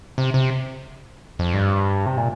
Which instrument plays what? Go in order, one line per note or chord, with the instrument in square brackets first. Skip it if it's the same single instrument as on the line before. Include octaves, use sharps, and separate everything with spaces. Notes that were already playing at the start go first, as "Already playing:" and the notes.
[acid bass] C3
C3
F2
G2
C3
A#2